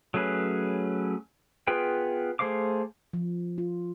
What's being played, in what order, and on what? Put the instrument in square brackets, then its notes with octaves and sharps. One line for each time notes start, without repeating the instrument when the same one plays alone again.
[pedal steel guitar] F#3 A3 C#4 G#4 B4
B3 F4 G#4 B4 G5
A3 G#4 C5 F5 D6
[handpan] F3
F4